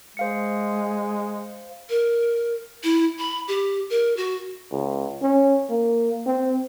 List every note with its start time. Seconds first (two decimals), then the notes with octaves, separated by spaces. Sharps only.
0.17 G#3 C5 F5 C#7
1.90 A#4
2.84 E4
3.19 B5
3.48 G4
3.90 A#4
4.17 F#4
4.71 C#2
5.22 C#4
5.70 A#3
6.26 C4